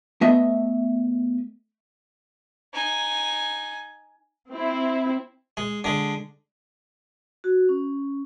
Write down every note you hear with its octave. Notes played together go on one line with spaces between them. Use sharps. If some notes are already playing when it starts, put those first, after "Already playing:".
A3 B3 D#5 E5
D#4 G#5
C4 E4
G#3
D3 G#3
F#4
C#4